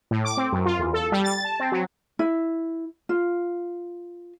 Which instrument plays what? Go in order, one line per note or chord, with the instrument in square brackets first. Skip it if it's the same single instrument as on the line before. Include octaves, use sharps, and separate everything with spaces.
[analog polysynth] A2
D6
C4
F#2
F4
E2
A4
G3
A6
A5
C4
F#3
[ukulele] E4
F4